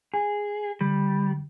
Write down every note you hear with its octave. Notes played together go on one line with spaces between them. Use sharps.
G#4
D3 G3